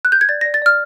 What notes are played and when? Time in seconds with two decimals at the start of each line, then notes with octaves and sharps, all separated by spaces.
0.05 F#6
0.12 G6
0.21 G#6
0.29 D5 A6
0.41 D5 A#6
0.54 A6
0.62 D5 F6